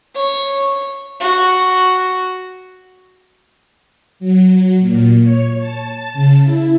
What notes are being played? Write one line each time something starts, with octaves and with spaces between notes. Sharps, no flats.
C#5
F#4
F#3
A#2
C#5
A5
C#3
E4